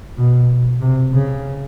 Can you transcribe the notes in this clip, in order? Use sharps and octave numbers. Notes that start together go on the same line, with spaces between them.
B2
C3
C#3